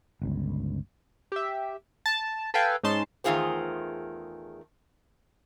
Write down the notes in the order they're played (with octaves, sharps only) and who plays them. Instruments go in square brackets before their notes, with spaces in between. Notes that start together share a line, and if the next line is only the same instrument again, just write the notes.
[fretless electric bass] G1 C#2
[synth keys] G4 E5
A5
A4 B4 F5 G5 G#5
G#2 C#4 D#4 A5 C6
[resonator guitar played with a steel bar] E2 D#3 A3 F4 G#4 C5